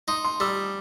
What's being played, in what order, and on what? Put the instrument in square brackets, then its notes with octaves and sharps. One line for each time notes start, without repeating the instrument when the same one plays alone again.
[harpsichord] D#4 [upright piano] C6
[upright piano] C6
[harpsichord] G3 [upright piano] E6